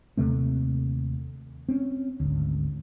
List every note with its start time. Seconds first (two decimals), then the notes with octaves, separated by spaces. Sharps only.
0.17 D#2 C3 A3 C4
1.69 C4 C#4
2.20 G#1 D2